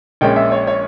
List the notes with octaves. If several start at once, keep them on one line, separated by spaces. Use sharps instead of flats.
A#1 A#2 G#3 C#4 G5
E5
C#5
C#5